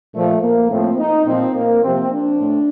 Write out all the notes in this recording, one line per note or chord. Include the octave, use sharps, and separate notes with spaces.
A#2 F3 A3
A#3
A2 F3 C4
D#4
A#2 F3 C4
A#3
C3 F3 C4
D4
A2